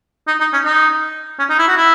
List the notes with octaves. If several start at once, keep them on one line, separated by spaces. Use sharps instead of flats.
D#4
D#4
C#4
D#4
C#4
D#4
E4
F#4
E4